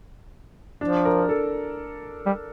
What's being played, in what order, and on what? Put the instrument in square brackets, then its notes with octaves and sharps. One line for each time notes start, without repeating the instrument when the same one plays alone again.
[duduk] F3 [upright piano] D4
[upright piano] A#4
A4
[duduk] G3